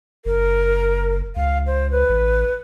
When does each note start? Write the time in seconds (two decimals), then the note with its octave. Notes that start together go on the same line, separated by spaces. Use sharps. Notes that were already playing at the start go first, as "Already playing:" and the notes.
0.25 F#1 A#4
1.36 C#2 F5
1.67 C5
1.92 B4
2.09 A1